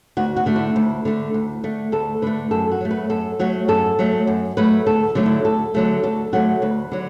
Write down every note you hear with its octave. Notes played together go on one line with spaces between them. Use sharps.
D2 F#4
F#4
D3 A3
E4
D2
D3 A3
D2
D3 A3
D2 A4
D3 A3 B4
F#2 A4
F#4
F#3 A3
B4
F#2 A4
F#3 A3 F#4
F#2 A4
F#3 A3
F#2
F#3 A3 B4
D2 A4
D3 F#3 A3
E4
D2 A4
D3 F#3 A3 A4
D2 A4
D3 F#3 A3 F#4
D2 B4
D3 F#3